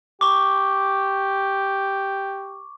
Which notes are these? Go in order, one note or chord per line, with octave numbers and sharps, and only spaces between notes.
G4 C#6 D6